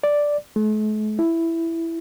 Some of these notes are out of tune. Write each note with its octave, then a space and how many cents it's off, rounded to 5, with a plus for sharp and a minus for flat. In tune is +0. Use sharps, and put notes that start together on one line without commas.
D5 +0
A3 -45
E4 +5